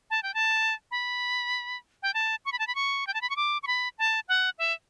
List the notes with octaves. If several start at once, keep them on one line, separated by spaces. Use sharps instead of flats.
A5
G5
A5
B5
G5
A5
C#6
B5
A5
B5
C#6
G5
A5
B5
C#6
D6
C#6
B5
A5
F#5
E5